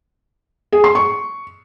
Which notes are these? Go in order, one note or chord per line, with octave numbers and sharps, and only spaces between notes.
G#4
C6
C#6